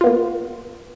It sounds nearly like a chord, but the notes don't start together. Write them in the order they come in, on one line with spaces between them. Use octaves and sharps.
F4 B3 A#3